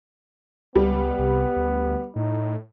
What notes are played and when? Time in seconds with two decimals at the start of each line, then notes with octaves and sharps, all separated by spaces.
0.75 C#2 G3 B3
1.19 C2
1.57 D2
2.16 A2 D#4